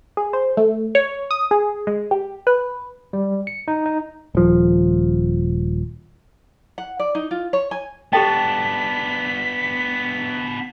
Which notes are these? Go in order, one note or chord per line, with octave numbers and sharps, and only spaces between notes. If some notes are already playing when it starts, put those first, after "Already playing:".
G#4
C5
A3
C#5
D#6
G#4
G#3
G4
B4
G3
C#7
D#4
D#4
D#1 F3
F#5
D5
D#4
F4
C#5
G#5
B3 D4 G4 A4 G5 A5 B6